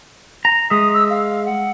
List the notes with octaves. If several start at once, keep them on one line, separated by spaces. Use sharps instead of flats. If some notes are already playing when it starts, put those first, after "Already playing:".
A#5
G#3 E5 D#6
E6
F5
F#5